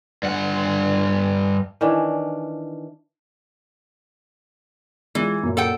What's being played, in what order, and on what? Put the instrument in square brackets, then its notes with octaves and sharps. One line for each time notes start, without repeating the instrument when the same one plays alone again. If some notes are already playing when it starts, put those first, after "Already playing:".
[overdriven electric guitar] G2 F#5
[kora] D#3 E3 C#4 D4
[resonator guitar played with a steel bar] E3 [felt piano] G#3 F4
[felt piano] F#2 A#2
[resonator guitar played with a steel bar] A4 F#5 G5